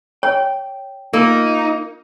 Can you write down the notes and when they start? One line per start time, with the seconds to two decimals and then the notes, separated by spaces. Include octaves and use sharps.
0.23 C#5 G5
1.13 A#3 D#4 F4 A#4 D#5 F5